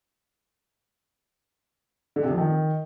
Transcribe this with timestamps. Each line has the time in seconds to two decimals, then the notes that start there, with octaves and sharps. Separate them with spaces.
2.16 D3
2.23 C3
2.31 F3
2.38 D#3